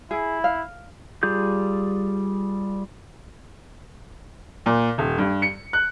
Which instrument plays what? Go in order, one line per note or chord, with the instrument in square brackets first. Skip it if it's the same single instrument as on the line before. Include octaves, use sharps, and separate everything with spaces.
[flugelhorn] E4 [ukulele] G#4
[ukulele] F5
[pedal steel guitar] G3 F4 G#4 G6
[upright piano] A#2
D#1
G2
C#7
F#6